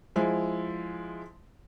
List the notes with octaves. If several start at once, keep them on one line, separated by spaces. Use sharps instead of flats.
F3 G#3 E4